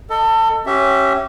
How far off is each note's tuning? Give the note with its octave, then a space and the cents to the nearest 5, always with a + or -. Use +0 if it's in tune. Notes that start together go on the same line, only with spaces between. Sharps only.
A4 +30 D#5 +5
C#4 -15 G4 -30 E5 +0